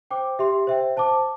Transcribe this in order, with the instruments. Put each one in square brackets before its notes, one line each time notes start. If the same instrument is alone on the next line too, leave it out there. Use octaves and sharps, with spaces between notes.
[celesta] C5 G5 D6
G4 E5 C6
C5 E5 G5
C5 A5 D6